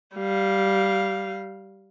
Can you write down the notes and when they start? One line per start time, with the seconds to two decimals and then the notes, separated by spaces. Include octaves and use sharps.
0.15 G3 F5